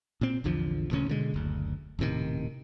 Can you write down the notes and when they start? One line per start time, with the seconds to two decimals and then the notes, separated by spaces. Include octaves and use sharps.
0.21 A#2 C4
0.44 A#1 E2 D3 F3
0.91 D#1 D2 C#3 C#4
1.08 B2 D3 G#3
1.34 F#1 D2
1.99 D#1 A2 C3 D#3